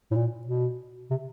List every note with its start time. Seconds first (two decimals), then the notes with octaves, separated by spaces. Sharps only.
0.11 A2
0.15 A#2
0.47 B2
1.11 C3